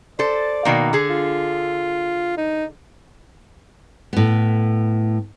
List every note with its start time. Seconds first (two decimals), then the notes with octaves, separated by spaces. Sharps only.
0.19 A4 C5 D5
0.65 B2 D#3 A#3
0.93 D3 G#4
1.10 F4
2.37 D#4
4.13 A2 B3